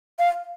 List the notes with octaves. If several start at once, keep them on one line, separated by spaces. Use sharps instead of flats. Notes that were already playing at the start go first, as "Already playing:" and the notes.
F5